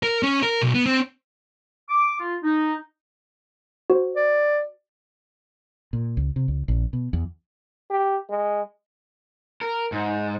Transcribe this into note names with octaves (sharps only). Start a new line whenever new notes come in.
A#4
C#4
A#4
B1
B3
C4
D6
F4
D#4
F#4 C5
D5
A#2
C#2
C3
C#2
A#1
B2
E2
G4
G#3
A#4
G#2